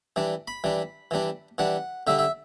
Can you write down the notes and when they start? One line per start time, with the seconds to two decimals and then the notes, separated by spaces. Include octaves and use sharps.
0.16 E3 G3 D4
0.48 B5
0.64 E3 G3 D4
1.11 E3 G3 D4
1.58 E3 G3 D4 F#5
2.07 D3 G3 D4 E5
2.19 E5